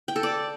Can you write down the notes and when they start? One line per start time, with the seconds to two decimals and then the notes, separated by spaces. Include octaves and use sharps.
0.08 G5
0.16 A4
0.23 D5